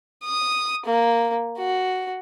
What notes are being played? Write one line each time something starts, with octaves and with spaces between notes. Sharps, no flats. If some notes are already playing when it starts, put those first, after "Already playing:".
D#6
A#3
F#4